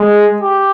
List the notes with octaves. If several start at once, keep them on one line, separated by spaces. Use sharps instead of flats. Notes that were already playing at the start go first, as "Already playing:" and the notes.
Already playing: G#3
G4